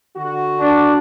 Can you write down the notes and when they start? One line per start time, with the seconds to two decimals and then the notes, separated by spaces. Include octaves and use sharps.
0.16 D3 F#4
0.59 D4